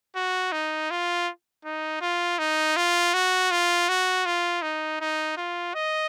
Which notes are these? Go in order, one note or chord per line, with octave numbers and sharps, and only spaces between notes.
F#4
D#4
F4
D#4
F4
D#4
F4
F#4
F4
F#4
F4
D#4
D#4
F4
D#5